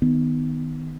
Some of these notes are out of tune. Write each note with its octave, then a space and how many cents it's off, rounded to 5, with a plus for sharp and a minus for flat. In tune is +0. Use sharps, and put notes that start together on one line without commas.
D#3 +0 B3 +10